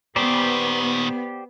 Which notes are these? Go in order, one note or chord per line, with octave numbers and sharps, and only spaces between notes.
A#2 D#3 B3 G4 C5 D5